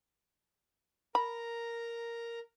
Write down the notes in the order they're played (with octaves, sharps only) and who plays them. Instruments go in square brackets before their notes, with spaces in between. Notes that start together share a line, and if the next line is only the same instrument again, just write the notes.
[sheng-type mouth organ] A#4 A#5 [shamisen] B5